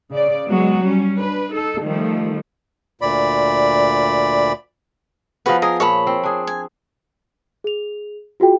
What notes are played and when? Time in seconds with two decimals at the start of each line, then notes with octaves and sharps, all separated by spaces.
0.12 C#3 D5
0.46 F#3 G#3 B3 F#4
0.81 G3 C#4
1.17 D4 B4
1.52 D#4 A4
1.82 D#3 F3 G3 A3
3.01 D2 A#2 D5 B5
5.46 F3 B3 F#4 G#4 B4
5.62 G#4 A#4 D#5
5.80 A#2 C#5 A5 B5
6.07 C4
6.23 D4 G#4
6.47 G#5
7.64 G#4 F7
8.40 F4 F#4 G#4 G5